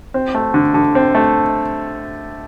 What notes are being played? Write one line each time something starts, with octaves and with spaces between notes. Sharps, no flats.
C4
A3
D3
D3
C4
A3